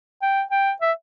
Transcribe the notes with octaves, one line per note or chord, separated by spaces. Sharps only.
G5
G5
E5